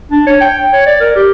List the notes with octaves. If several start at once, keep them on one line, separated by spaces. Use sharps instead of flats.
D4
C#5
G5
C#5
D5
A#4
G4